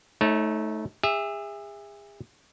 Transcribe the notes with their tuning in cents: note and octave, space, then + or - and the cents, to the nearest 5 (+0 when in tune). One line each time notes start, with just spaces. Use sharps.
A3 -15 D#4 +20 C#5 -25
G#4 -35 E5 +0